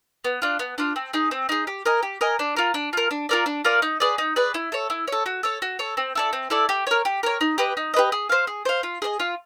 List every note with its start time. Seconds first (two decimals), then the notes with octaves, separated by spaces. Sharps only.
0.24 B3
0.42 D4 F4
0.59 B3
0.78 D4 F4
0.96 C4
1.13 D#4 G#4
1.31 C4
1.49 D#4 G#4
1.67 G4
1.86 A#4 D#5 G#5
2.03 G4
2.21 A#4 D#5 G#5
2.39 D4
2.56 F4 A#4
2.74 D4
2.93 F4 A#4
3.11 D4
3.29 F4 A#4 D5
3.46 D4
3.65 F4 A#4 D5
3.82 D#4
4.00 G#4 B4 D5
4.18 D#4
4.36 G#4 B4 D5
4.54 E4
4.72 A4 C#5
4.90 E4
5.08 A4 C#5
5.26 F#4
5.43 A4 C#5
5.62 F#4
5.79 A4 C#5
5.97 C4
6.15 E4 A4 D5
6.33 C4
6.50 E4 A4 D5
6.69 G4
6.87 A#4 C#5
7.05 G4
7.23 A#4 C#5
7.41 D#4
7.58 G4 B4 D#5
7.77 D#4
7.94 G4 B4 D#5
8.12 G#4
8.29 C5 F5
8.47 G#4
8.65 C5 F5
8.83 F4
9.02 G#4 C5 D#5
9.19 F4